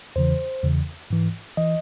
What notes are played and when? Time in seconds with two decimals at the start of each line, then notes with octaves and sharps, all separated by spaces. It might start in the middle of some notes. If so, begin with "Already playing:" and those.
0.16 E2 C#3 E3 C5
0.63 E2 C#3 E3
1.10 G#2 E3
1.57 E3 D#5